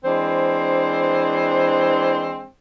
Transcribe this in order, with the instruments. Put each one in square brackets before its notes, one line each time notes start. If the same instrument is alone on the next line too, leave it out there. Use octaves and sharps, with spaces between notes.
[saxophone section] E3 G#3 C4 D4 C5